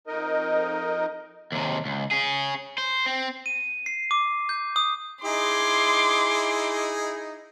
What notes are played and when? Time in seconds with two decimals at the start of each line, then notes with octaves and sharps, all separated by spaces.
0.07 F2 D#4 A#4 D#5
1.52 D#2 C3
1.86 C#2
2.11 C#4 G#4
2.78 C5
3.06 C4
3.46 D#7
3.86 C7
4.11 D6
4.49 G6
4.76 D#6
5.25 D#4 E4 G#4 C6 D6